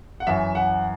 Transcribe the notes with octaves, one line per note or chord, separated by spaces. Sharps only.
F#5
F#2 E3 E5
F#5